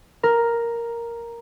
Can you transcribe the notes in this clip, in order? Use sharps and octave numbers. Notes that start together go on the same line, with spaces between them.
A#4